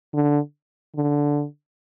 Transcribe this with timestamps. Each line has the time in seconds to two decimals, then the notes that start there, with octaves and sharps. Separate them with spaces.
0.14 D3
0.96 D3